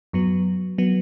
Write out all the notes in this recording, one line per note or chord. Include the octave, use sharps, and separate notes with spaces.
F#2 F#3 B3
F#3 B3